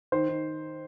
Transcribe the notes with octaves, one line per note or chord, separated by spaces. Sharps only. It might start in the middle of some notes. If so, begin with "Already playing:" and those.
D#3 C5
D#3